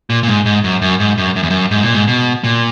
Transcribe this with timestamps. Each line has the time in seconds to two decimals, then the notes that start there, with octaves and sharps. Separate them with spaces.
0.10 A#2
0.23 A#2
0.28 G#2
0.46 G#2
0.64 F#2
0.82 F#2
1.00 G#2
1.18 F#2
1.36 F#2
1.43 E2
1.50 F#2
1.71 G#2
1.83 A#2
1.95 G#2
2.07 B2
2.44 A#2